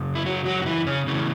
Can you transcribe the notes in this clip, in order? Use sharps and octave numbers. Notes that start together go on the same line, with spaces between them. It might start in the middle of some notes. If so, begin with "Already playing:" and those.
Already playing: F#2 C#3
E4
F#3 F#4
F#3 F#4
F#4
E3 E4
C#3 C#4
A2 C#3 E3 C#4